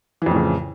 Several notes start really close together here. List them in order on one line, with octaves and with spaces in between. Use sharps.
E3 F2 A2 C#3